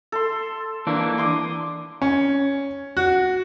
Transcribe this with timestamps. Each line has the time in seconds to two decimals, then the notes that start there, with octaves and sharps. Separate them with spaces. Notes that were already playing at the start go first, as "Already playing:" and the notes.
0.12 A4 C6
0.87 E3 A#3 D4
1.18 C6 D6 D#6
2.02 C#4
2.97 F#4